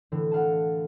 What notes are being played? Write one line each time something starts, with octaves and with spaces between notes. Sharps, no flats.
A2 D3 E3
D5 F5 F#5 A5